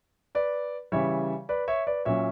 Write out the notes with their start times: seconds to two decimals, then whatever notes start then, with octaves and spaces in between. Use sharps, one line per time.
0.35 B4 D5
0.92 C#3 E3 G3 C#5 E5
1.49 B4 D5
1.68 C#5 E5
1.87 B4 D5
2.05 A#2 F#3 C#4 C#5 E5